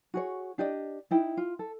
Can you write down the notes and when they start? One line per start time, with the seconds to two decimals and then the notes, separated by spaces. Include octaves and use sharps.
0.14 F#4 G#4 C#5
0.58 D4 G4 D5 D#5
1.11 D#4 E4 G5
1.37 F4
1.59 A4